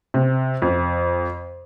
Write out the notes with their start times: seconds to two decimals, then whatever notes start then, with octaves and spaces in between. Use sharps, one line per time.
0.14 C3
0.62 F2